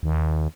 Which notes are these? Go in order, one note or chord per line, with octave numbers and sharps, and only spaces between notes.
D#2